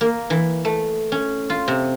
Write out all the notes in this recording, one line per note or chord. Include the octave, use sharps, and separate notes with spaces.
A#3
E3
A3
C#4
F4
C3